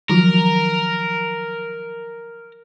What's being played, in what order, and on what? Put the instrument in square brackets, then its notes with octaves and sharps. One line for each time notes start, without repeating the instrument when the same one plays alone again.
[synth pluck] D#3 F3 F#3 [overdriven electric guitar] A#4